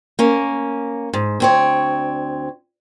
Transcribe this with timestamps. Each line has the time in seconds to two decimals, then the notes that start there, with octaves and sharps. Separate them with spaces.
0.19 A#3 C#4
1.13 G#2
1.40 D2 C4 C#5